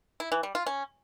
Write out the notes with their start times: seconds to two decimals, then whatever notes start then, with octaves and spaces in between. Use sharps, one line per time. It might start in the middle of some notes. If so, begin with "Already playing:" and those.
0.20 E4
0.32 E3
0.43 G3
0.55 F4
0.66 C#4